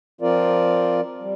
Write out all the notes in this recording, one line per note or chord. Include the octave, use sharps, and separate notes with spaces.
F3 C4 F4 A#4 D5
G3